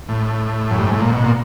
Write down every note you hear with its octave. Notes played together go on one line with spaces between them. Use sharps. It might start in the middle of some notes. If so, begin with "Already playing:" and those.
A2
F#2
G2
G#2
A2
A#2
B2
A#2